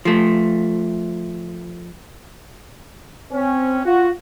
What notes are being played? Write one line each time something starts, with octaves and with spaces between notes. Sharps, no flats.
F3 A3
C4 C#4
F4 F#4